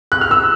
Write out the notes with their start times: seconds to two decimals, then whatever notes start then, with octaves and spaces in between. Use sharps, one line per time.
0.12 F#6
0.21 F6
0.31 E6